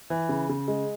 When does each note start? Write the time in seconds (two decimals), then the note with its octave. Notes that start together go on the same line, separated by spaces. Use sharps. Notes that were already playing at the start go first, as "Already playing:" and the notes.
0.10 E3
0.29 C#3
0.49 C#3
0.68 G#3